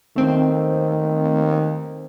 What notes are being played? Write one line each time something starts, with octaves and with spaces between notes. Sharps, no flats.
D#3 A3 C4